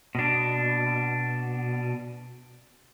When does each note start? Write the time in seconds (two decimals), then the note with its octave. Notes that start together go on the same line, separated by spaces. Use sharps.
0.15 B2 D4